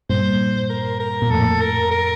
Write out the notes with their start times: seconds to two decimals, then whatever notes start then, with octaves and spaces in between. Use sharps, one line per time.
0.10 G2 A#2 C5
0.70 A#4
1.00 A#4
1.22 A#2
1.30 F2 A2 A4
1.61 A#4
1.91 A#4